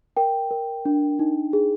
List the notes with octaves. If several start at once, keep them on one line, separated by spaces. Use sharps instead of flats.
A#4 G5
A#4
D4
D#4
G#4